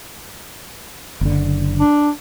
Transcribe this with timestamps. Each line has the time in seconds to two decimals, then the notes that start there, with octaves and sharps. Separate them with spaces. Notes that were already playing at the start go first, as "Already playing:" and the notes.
1.21 F#1 D3
1.80 D4